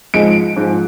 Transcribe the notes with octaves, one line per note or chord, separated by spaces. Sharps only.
G#2 F3 G#3 D7
G#2 F3 G#3